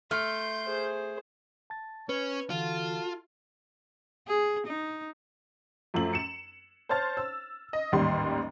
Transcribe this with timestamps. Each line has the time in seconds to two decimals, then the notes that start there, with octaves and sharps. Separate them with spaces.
0.11 A3 C6 F6 G6
0.66 G#4 C5
1.70 A5 A6
2.09 C#4 B4 C#5
2.50 D3 E3 F4 F#4 A4 A5
4.28 G#4
4.67 D#4
5.94 F#2 F3 A3 F#7
6.13 C#7 E7
6.89 C5 C#5 A5 F6 A6
7.17 E6
7.73 D#5
7.92 A1 D#2 G#2 G3 C6